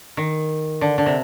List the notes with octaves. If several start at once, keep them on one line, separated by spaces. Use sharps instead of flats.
D#3
D3
D3
C3